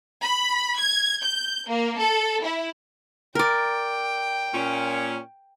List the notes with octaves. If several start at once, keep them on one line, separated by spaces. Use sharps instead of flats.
B5
G#6
G6
A#3
A4
E4
A#4 D5 G5
A#2 C#4